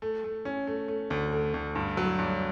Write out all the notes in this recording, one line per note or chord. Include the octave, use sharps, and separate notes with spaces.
A3
A3
C#4
A3
A3
D2
A3
D2
G2
F#3
G2